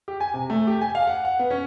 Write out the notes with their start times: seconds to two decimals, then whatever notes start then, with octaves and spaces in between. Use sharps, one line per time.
0.08 G4
0.20 G#5
0.34 C3
0.50 A3
0.67 G4
0.81 G#5
0.95 F5
1.07 F#5
1.25 F#5
1.39 B3
1.51 C#4